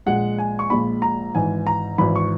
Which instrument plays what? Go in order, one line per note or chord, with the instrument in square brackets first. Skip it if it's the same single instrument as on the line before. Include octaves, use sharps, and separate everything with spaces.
[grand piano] A#1 A#2 G#3 F#5
G#5
C#6
A#1 A#2 G#3 B5
A#5
G#1 G#2 E3 G#5
A#5
G#1 G#2 E3 B5
C#6